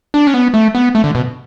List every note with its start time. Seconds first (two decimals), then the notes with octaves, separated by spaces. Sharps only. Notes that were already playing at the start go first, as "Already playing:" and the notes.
0.14 D4
0.27 C#4
0.34 B3
0.54 A3
0.75 B3
0.95 A3
1.04 D3
1.15 B2